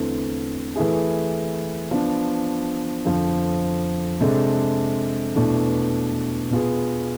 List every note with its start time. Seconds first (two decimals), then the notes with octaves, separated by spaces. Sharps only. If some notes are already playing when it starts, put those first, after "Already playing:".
Already playing: E2 D3 A3 C4
0.76 E3 A3 E4 G#4
1.91 F3 B3 D4
3.06 F2 D3 F3
4.21 C3 G#3 D4 A4
5.36 E2 B2 A3 D4
6.51 B2 B3 F4 G#4